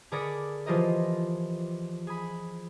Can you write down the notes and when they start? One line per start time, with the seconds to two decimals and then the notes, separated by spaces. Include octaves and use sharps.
0.11 D3 G#4 A#4 D5 B5 C#7
0.66 E3 F3 F4 G4 A#4 D#5
2.07 G#4 B5